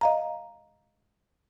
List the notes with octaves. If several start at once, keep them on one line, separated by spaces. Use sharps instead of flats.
D#5 F5 A#5